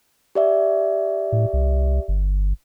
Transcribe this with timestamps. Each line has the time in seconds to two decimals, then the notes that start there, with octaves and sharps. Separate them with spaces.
0.35 G4 D5 E5
1.32 A2
1.53 C2
2.08 G1